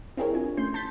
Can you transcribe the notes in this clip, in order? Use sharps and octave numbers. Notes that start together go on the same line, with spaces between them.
C4 E4 G4 G#4 A#4 C#5
D4 F4 G#5
A3 C#4 C6 G6
A5 C6 G6 A6 B6